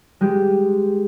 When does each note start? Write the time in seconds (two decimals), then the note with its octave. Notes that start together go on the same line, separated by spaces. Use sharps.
0.21 G#3 G4